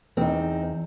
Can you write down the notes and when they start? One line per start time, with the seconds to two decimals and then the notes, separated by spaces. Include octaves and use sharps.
0.17 E2 C4 D#4